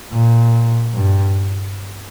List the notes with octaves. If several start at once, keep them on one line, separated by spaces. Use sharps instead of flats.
A#2
G2